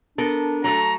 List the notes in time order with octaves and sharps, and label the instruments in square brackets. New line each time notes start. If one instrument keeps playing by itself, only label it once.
[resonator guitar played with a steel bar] B3 A4 A#4 [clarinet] D4
[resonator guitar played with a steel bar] F#3 A3 A4 [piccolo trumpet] A#5